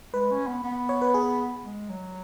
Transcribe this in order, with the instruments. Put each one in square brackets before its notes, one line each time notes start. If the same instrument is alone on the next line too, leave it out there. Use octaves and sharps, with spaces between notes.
[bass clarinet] G#3 [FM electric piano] B4
[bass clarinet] C#4
B3
B3
[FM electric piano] C#5
B4
G#4
[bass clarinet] G#3
F#3